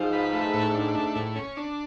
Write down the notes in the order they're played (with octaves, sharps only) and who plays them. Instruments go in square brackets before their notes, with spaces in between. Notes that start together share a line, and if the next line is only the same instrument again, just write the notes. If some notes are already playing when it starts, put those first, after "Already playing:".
Already playing: [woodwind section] G#2 [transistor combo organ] F3
[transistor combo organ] B4
A3
A2
D4
A3
A2
C#4
D4